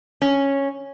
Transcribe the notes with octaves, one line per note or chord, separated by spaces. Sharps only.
C#4